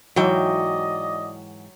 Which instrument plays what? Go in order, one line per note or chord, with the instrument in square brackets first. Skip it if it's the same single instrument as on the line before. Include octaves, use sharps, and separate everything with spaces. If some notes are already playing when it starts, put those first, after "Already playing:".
[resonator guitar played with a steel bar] G#2 E3 G5 [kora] F#3 [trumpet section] D5 D#5